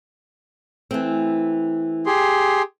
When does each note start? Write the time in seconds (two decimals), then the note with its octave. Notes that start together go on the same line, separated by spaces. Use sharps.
0.91 E3 A3 C4
2.06 G4 G#4 C6